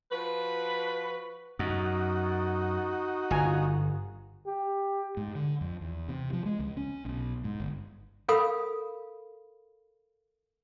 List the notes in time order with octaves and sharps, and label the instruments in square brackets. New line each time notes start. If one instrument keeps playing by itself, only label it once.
[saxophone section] F3 F#4 B4
[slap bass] F#2 [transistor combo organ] D#4 F#4
[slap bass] G1 [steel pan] F4 G#5 A#5
[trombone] G4
[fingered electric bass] G#2
D3
F2
E2
C3
F3
G#3
C#2
C#4
B1
G#2
G1
[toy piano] A4 A#4 F5 B5 D#6